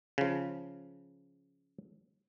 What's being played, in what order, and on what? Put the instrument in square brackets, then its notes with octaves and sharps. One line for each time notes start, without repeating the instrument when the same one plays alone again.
[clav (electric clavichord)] C#3 F3